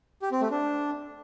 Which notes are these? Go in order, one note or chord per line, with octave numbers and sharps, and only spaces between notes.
G4
C4
A3
D4